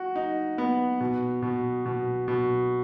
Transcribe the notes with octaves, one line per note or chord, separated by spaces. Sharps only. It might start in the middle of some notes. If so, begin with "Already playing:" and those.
Already playing: F#4
D#4
B3
B2
B2
B2
B2